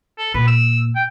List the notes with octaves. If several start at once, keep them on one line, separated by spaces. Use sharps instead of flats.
A4
A#2 B4
E6
G5